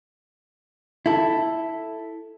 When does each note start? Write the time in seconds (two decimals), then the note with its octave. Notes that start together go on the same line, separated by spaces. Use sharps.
1.06 E4 A4